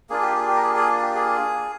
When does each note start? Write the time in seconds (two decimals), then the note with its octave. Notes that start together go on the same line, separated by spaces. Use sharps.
0.10 A#3 D4 F4 G#4
0.22 G4
0.35 G#4
0.48 G4
0.56 A#4
0.62 G#4
0.76 G#4
1.02 G4
1.16 G#4